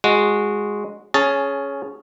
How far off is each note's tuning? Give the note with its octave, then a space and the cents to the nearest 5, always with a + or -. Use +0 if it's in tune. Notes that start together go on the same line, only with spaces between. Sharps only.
G#3 -5 F#4 -15
C#4 +0 G#4 +15 A5 +0